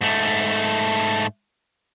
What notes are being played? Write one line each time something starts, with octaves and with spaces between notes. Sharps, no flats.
G#2 A3